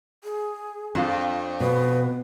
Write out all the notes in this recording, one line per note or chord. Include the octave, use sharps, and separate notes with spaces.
G#4
F2 D4 F4
B2 B4